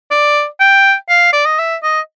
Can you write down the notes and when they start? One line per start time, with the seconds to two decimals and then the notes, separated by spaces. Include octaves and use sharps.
0.11 D5
0.60 G5
1.09 F5
1.33 D5
1.46 D#5
1.59 E5
1.83 D#5